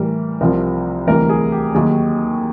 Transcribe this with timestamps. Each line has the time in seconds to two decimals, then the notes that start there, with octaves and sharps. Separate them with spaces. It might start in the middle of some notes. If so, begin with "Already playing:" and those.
Already playing: A2 E3 G3 A#4
0.41 C2 C3 F3 A#4
1.07 D2 C3 E3 G3 A#4
1.29 G#4
1.52 G4
1.74 D#2 D#3 F#3 G#4